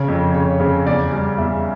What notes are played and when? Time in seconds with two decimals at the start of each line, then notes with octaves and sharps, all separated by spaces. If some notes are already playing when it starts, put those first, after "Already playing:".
Already playing: C#3 C#5
0.08 F2
0.34 C#3 C#5
0.60 C#3
0.86 E2 D5
1.12 G3 D5
1.38 E2 E5